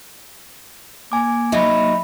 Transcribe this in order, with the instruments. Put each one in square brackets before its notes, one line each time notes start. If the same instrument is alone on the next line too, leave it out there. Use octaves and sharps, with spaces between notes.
[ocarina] A#3 [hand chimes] G#5 D6
[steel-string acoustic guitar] F#3 D#4 [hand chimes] E5 B5